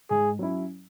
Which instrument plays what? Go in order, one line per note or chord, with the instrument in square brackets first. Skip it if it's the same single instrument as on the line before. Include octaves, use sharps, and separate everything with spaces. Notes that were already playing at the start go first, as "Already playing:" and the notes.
[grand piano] G#2 [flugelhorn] G#4
[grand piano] F#3 C#4 E4